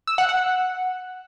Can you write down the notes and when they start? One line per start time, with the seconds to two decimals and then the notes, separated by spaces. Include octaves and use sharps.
0.07 E6
0.18 F#5
0.29 F#5